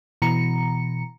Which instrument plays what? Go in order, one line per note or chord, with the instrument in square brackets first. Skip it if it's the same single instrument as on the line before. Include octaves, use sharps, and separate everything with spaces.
[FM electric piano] B2 E3 A#5 C#7